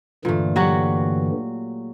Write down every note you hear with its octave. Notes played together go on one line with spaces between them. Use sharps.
G2 A#2 D3 E3 A3
F#3 F#4 G4